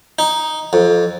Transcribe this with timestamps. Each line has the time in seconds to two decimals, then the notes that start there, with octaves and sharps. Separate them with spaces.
0.19 D#4
0.73 F2